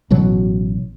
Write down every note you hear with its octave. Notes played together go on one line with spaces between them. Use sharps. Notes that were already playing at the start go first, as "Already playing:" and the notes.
A1 B2 F#3